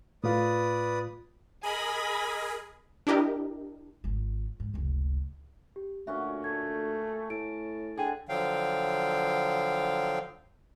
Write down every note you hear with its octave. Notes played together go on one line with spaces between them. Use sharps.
A2 F4 B4 D5 D#6
G#4 A#4 D#5 G#5 B5 A#6
D4 E4 G4 A#4 D#5
G#1 F4
G#2
F1 C#2
G4
D2 A#2 C#4 F#4 E5
A3 G#6
A2 A5 D7
D3 D4 G#4 G5 D#7
D3 F3 F#3 F5 G5